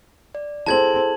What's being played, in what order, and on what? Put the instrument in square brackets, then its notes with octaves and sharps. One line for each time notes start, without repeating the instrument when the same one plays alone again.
[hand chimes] D5
[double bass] C4 [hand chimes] E4 G#4 A4 [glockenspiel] A5 G#6 F#7